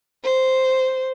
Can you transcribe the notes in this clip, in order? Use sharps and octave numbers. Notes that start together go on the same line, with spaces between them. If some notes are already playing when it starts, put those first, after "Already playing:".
C5